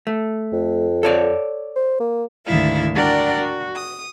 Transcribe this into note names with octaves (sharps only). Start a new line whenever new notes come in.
A3
F2
A4 C#5 D5
C5
A#3
D2 G#2 D#3 E4 E5 F5
D4 F#4 A#4 D5 F#5 G5
F#4
D#6